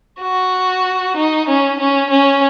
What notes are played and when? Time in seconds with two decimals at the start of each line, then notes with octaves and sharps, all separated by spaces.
0.22 F#4
1.16 D#4
1.48 C#4
1.79 C#4
2.11 C#4